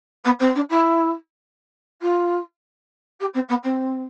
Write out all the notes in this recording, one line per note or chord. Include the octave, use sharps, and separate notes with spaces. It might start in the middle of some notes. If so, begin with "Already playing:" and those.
B3
C4
D4
E4
F4
G4
C4
B3
C4